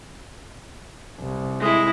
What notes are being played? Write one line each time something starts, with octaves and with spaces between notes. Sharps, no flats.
C2
G#3 E4